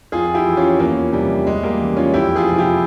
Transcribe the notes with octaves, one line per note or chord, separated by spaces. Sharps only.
F2 F4 G#4
E4 G4
E3
C#4 F4
E2 A#3 C#4
C3 F3 G3
E2 G#3
G3 A#3
C#3 E3
C#4 F4
F2 E4 G4
F4 G#4
C3 F3
E4 G4